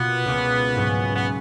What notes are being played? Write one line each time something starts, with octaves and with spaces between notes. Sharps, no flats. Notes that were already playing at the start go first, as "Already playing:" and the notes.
Already playing: B2 A#3 B3 F4
C#2 B2 A#3 F4
G#2 F#3 C#4
B3